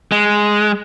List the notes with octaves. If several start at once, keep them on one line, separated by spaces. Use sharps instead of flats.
G#3